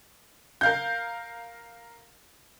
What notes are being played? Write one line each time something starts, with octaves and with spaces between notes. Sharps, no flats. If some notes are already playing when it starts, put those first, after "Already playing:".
A#4 F5 G6